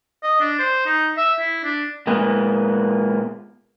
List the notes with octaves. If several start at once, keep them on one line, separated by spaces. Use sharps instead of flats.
D#5
D4
C5
D#4
E5
E4
D4
A#2 G#3 A#3 B3